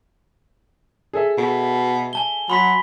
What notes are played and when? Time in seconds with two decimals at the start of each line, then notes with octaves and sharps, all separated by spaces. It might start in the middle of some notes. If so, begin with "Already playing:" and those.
1.13 G#4 A4 E5
1.38 B2
2.13 G#5 A5 G7
2.50 F#3 B5 C6 B6